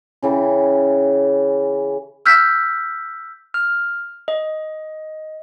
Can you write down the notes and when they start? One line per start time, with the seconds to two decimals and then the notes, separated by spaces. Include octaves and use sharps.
0.22 C#3 E3 G5 A5
2.26 E6 F6 G6 B6
3.54 F6
4.28 D#5